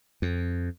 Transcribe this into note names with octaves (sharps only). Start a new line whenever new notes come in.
F2